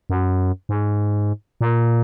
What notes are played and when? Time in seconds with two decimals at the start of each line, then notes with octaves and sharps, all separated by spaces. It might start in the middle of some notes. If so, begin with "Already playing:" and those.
0.10 F#2
0.69 G#2
1.61 A#2